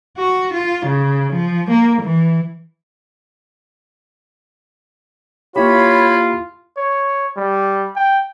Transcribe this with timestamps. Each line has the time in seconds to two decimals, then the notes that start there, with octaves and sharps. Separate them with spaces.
0.18 F#4
0.54 F4
0.86 C#3
1.33 F3
1.71 A#3
2.02 E3
5.56 A#3 E4 F4 G4 C#5 B5
6.77 C#5
7.37 G3
7.96 G5